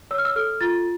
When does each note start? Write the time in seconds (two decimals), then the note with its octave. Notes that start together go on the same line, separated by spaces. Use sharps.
0.11 C#5 E6
0.18 F6
0.25 E6
0.36 A4 F6
0.61 F4 A6